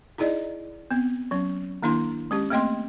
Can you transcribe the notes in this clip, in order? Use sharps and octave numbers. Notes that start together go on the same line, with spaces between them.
D#4 E4 G#4 D5 D#5
B3 C4
F#3 C#4
D#3 A#3 D4 E4 C6
G#3 C#4 G4
A3 A#3 C4 D#5 G5 C6